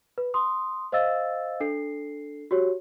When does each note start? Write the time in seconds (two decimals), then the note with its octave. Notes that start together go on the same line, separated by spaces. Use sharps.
0.18 B4
0.34 C6 D#6
0.92 C5 D#5 F5 E6 A6
1.60 D4 A4 C7
2.51 F#4 G4 C#5